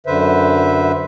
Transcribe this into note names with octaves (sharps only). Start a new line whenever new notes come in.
F#2 D3 B4 C5 E5